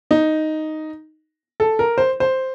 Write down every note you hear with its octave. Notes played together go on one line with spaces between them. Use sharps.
D#4
A4
A#4
C5
C5